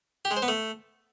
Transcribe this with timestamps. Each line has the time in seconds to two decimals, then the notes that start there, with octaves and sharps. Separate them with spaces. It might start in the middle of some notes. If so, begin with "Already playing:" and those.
0.25 G4
0.31 G#3
0.37 C5
0.42 B3
0.48 A3